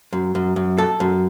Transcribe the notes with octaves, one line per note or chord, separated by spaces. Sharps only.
F#2
F#2
F#2
A4
F#2